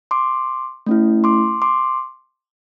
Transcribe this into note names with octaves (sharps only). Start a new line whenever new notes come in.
C6 D6
A3 C#4 E4
C6 D6
C6 D6